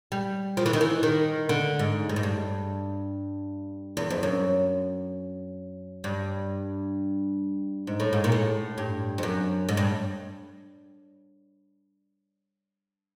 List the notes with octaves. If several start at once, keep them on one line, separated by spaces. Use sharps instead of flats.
G3
F3
E3
D#3
E3
D#3
D3
G#2
G2
G#2
G2
E2
F2
F#2
G2
G#2
A2
G#2
A#2
A2
G2
F2
F#2
G#2
G2